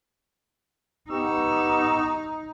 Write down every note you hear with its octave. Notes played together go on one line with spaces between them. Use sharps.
B3 D#4 G4 C#6 E6